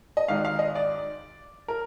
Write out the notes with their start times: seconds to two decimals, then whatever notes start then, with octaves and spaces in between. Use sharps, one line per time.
0.17 D#5
0.28 G#1 G#2 D#3 F5
0.45 F5
0.59 D#5
0.75 D5
1.68 A#4